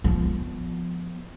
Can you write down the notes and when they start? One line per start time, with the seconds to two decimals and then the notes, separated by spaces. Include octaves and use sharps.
0.04 F3 B3